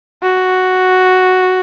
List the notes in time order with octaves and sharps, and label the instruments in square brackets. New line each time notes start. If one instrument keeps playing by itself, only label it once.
[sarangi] F#4